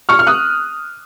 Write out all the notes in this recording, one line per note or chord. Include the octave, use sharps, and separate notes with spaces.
C#6 F6
F6
D#6 F#6